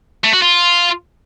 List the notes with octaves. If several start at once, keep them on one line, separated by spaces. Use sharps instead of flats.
A3
F#4
F4